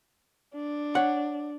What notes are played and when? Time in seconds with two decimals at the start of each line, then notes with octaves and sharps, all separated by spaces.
0.54 D4
0.95 C#5 F#5